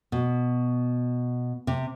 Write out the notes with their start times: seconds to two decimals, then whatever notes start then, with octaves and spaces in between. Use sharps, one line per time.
0.12 B2
1.67 C3